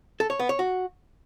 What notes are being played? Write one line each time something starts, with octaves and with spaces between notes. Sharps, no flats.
A4
C#5
B3
C#5
F#4